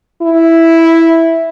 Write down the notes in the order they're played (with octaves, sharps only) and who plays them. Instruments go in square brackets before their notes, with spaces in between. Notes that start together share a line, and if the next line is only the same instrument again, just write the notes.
[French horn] E4